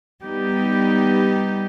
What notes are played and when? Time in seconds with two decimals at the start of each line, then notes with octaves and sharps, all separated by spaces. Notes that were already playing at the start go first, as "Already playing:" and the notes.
0.22 G3 B3 D#4 G4